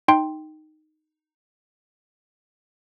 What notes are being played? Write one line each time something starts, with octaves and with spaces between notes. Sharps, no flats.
D#4 G5 C6